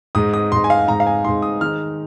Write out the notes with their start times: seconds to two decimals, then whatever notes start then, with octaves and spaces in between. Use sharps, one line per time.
0.15 G#2 G#3 D#4 D#6
0.34 D#6
0.52 G#2 G#3 D#4 C6
0.64 G#5
0.70 F5
0.88 G#2 G#3 D#4 A#5
1.00 F5
1.07 G#5
1.25 G#2 G#3 D#4 C6
1.42 D#6
1.61 D#3 G#3 D#4 F6